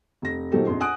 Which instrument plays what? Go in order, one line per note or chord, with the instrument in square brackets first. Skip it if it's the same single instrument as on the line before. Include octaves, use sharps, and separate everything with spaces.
[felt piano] F1 A#6
A#2 F#3 C4 D#4 G4 A4
A#1 F2 C6
F#5 G#5 D#6 F#6 D7